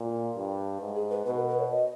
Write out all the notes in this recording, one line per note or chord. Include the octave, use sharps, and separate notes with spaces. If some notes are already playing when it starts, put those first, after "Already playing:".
Already playing: A#2
G2
G#2
G#4
B4
B2 B4
A#4
A#4
B4
C#5
D#5